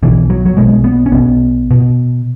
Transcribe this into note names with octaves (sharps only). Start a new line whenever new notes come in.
B1 B2 E3
F#3
F#3
B1 B2 G#3
B3
C#4
B1 B2 B3
B2